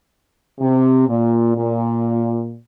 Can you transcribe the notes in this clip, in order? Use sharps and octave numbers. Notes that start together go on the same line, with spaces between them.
C3
A#2
A#2